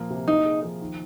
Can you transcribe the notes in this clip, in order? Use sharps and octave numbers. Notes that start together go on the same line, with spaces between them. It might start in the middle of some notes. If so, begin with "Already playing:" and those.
Already playing: A#2 F3 A#3
C3
A#3 D#4
G#4
F3
D#3